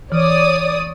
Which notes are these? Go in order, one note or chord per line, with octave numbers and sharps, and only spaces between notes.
E3 C#5 D5 D#6